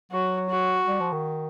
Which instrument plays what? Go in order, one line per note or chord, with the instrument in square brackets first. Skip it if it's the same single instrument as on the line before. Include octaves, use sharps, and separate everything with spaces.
[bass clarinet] F#3 [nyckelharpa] F#4
[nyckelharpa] F#4
[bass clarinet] G3
F3
D#3